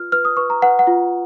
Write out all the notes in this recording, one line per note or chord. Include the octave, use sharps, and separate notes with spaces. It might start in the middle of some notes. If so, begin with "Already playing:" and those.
Already playing: F4 B4 F6
B4 F6
D#6
B4 C#6
A#5
B4 F#5
F#5
F4